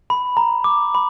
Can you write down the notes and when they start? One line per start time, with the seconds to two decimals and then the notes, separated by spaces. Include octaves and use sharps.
0.10 B5
0.37 A#5
0.64 D6
0.95 B5